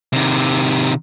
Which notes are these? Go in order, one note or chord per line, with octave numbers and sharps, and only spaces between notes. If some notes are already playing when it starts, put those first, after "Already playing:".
C3 D#3